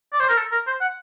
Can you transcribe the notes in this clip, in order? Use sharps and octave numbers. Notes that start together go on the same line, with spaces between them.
D5
C5
A#4
A4
A#4
C5
F#5